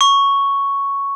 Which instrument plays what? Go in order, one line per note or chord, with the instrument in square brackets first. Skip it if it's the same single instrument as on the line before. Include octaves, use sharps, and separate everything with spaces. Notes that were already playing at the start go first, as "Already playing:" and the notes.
[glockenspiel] C#6